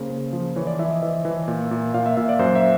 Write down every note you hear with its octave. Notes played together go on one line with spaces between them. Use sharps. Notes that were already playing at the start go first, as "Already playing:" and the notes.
Already playing: C#3 A#3 C5
C#3
F3
E3 C#5
D5
E3 E5
D5
D#5
E3 E5
E3
A#2
A#2
A#2 F5
E5
A#2 E5
D5
F#2 C5
E5